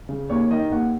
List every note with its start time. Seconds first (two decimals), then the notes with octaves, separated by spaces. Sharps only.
0.09 C#3
0.30 D#2 C#5
0.51 D#3 D#5
0.72 D#2 F#5